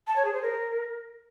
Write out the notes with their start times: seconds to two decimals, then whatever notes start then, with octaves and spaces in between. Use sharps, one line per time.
0.07 A5
0.15 C#5
0.24 G#4
0.33 C5
0.42 A#4